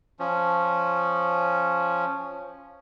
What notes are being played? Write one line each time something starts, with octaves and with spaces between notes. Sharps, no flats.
F3 C#4